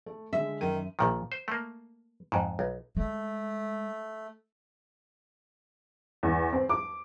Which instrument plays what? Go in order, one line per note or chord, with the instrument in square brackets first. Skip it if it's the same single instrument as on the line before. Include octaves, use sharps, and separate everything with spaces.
[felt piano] A3
[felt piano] D3 G#3 [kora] E5
[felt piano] F#2 D#7 [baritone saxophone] D#3
[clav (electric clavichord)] A#1 A#2 D#3
C5
A3 A#3
F2 G#2
B1
[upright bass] G#3 [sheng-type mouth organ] A3
[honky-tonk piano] E2
C4
D6